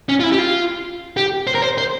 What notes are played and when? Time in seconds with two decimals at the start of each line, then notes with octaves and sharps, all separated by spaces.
0.09 C#4
0.20 F4
0.23 E4
0.32 G4
0.39 F4
1.17 G4
1.47 C5
1.55 A#4
1.62 C5
1.78 C5